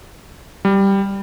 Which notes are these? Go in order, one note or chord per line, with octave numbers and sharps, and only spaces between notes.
G3